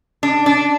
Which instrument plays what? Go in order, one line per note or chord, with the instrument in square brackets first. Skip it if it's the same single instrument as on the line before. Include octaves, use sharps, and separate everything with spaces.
[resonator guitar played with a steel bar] D4
D4